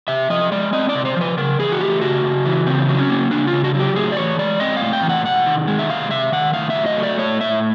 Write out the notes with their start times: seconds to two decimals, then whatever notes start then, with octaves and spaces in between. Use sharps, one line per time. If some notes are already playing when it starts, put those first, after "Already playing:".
0.08 C3 E5
0.30 F3 D#5
0.52 G#3 D5
0.73 C4 D#5
0.89 D5
0.95 C3
1.05 C5
1.17 F3 B4
1.37 C#3 A#4
1.59 E3 G#4
1.72 F#4
1.81 A3 G4
2.01 C#3 F#4
2.24 C#3
2.46 E3
2.66 C#3 C4
2.88 F#3
2.99 C#4
3.10 A#3
3.30 C#3 D4
3.47 F4
3.53 C#3
3.64 F#4
3.74 F#3
3.79 G4
3.96 A2 G#4
4.12 D5
4.17 E3 C#5
4.39 G#3 D5
4.60 C4 D#5
4.77 F5
4.82 A2
4.93 G5
5.03 E3
5.09 F#5
5.25 C3 F#5
5.46 D#3
5.67 G#3
5.79 E5
5.89 C3 F5
6.11 C3 E5
6.32 D#3 F#5
6.53 A2 F5
6.70 E5
6.76 F#3
6.86 D#5
6.97 A3
7.03 D5
7.19 A2 C#5
7.41 A2 E5